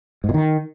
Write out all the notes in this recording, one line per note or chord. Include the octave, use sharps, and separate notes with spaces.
G#2
A#2
D#3